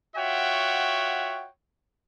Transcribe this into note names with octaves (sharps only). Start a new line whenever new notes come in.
F4 F#4 C#5 E5 F#5 G5